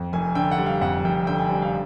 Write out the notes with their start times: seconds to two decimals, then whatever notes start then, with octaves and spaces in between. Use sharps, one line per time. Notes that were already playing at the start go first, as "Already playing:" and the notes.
Already playing: F2
0.13 F1 G#5
0.35 D3 G5
0.51 F#5
0.58 G3
0.66 F5
0.81 F2 F#5
1.04 F1 G5
1.27 D3 G5
1.38 G#5
1.50 G3
1.62 F5